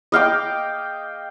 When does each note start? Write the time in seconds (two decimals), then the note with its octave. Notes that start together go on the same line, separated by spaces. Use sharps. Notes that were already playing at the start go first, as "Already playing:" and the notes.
0.12 D#5 F5 G5 D6